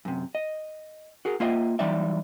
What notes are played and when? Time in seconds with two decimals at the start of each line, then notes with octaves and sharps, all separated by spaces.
0.05 F#2 C3
0.35 D#5
1.25 F#4 G#4 A#4
1.40 A#3 F4 C5 D#5 E5
1.79 E3 F#3 G3 D#4 D5 E5